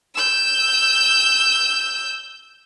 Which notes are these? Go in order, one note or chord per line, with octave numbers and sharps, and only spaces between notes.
E6 G6